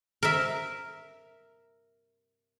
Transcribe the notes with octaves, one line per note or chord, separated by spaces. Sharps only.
A#4 E5